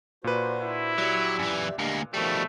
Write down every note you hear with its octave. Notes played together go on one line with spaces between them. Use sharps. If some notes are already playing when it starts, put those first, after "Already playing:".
A#2 D4 F#4 B4 C5
E4
F#3 G4 D5 E5
F#2 E3
D2 G#3 A#3 D4 G4
B2 D#3 F3 G3 A3